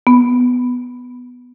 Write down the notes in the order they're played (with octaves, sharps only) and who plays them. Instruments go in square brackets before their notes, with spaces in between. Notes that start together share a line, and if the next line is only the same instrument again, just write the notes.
[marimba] B3